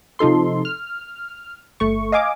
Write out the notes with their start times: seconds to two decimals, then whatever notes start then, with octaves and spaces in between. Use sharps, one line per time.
0.19 C3 F3 D#4 A4 C6
0.65 F6
1.80 G1 A3 C#6
2.12 D#5 F5 G#5 D6